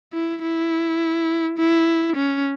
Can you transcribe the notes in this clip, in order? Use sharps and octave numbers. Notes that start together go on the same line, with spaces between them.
E4
E4
E4
C#4